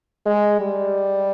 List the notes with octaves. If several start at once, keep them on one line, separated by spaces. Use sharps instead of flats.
G#3
G3